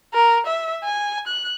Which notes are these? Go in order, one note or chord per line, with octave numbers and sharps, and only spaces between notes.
A#4
E5
G#5
F#6